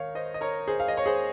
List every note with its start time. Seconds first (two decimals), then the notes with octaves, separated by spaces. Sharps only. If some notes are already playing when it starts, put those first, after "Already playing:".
Already playing: D#3 C#5 F5
0.15 C5 D#5
0.34 D#5
0.41 A#4 C#5
0.68 G#4 C5
0.80 F5
0.88 D#5
0.97 C#5
1.06 G#4 C5